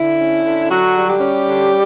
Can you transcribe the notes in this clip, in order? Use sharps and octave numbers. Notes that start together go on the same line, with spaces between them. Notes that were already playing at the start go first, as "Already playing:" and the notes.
Already playing: D3 E4
C#4
D3
D3 F#3 F#4
G3
G3 G4
C#4
D3